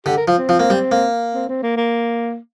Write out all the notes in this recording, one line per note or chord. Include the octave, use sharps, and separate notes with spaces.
D3 G4
A#4
F3
C4
F3
A#3
G3
A#3
C4
C4
A#3
A#3